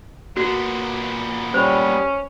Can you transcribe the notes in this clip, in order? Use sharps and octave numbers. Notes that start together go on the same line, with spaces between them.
A#2 B3 F#4
G3 C#4 C5 B5